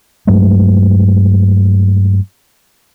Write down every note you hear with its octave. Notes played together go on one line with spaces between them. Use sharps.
G2 F#3 G#3 A3